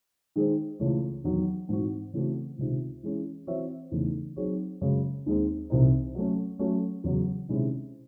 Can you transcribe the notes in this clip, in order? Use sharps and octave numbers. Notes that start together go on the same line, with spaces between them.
D#3 G#3 D#4 G#4 C5
C#2 C#3 E3 A3
E2 D#3 F#3
G#2 E3 C4 D#4 F#4
C#3 E3 A3 C4 F#4
C#2 C3 D#3
E3 G#3 C#4 E4
E3 C4 F#4 C#5 E5
E2 C#3 E3 A3 D#4
F#3 C4 D#4 G#4 C#5
F#2 C#3 G#3
D#2 D#3 G#3 C4 D#4
C2 C3 E3 C4 D#4
F#3 A3 C#4
F#3 A3 C#4
E2 C#3 F#3
C3 D#3 G#3 C#4 E4